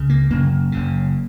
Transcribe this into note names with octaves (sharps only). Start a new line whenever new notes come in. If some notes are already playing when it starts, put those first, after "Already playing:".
Already playing: C#2 C#3
A#3
F#1 F#2 C#3 A#3
F#1 F#2 C#3